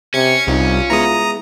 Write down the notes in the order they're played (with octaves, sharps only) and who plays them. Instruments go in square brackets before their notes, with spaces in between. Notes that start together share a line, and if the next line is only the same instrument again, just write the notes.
[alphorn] C3 [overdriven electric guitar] C#4 [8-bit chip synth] G#6 C#7
[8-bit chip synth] C2 [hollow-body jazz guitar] G3 C4 D#4 [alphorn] F4
[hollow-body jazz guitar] G#3 B3 E4 [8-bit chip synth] A#5 D#6